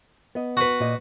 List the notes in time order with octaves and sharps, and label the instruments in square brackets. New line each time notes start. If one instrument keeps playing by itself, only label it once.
[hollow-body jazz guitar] B3 D#5
[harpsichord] F#4 B4
[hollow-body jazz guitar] A#2 D#5